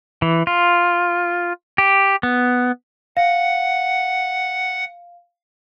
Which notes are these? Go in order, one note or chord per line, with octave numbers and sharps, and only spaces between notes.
E3
F4
G4
B3
F5 F#5